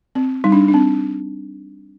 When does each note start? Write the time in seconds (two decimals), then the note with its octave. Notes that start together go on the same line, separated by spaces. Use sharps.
0.15 C4
0.44 G3 D#4
0.52 D4
0.68 D4
0.74 C4